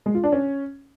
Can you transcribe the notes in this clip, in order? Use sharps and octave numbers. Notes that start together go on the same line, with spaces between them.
G#3
F4
D4
C#4